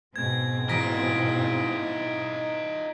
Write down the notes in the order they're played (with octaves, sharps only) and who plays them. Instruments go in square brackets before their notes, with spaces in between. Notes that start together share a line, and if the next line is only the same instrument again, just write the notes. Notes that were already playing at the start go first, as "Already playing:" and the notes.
[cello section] G#2 B2 C4 [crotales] G#6
[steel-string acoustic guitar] E3 [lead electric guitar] D#4 F4 [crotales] A#6 B6 D7